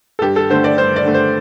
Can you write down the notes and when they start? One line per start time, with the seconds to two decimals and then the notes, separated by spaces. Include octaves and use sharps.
0.19 A4
0.22 G2 G4
0.36 A4
0.50 D3 A3 C5
0.64 D5
0.77 G2 C5
0.96 D5
1.05 D3 A3
1.14 C5